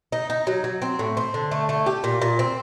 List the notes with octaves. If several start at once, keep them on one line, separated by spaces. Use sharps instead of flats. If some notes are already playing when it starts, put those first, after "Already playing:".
D#4
D#4
F#3
F#3
C4
A2
C4
D3
A3
A3
G4
A#2
A#2
C4